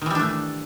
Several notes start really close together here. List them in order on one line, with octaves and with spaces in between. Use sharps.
D#3 E3 G3 D4 A3